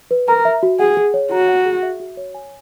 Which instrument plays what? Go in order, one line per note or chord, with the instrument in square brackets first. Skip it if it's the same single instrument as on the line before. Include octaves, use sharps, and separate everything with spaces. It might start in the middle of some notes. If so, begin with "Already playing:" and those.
[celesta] B4
[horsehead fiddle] A#4 [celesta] A#5
[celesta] E5
F#4
[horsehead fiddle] G#4 [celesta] F#5
[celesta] G#4
C#5
[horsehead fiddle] F#4 [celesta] A#5
[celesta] F#5
G#4
E5
F#4
C#5
G#5